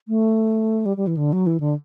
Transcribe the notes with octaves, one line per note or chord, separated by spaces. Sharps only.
A3
G3
G3
E3
D3
F#3
E3
D3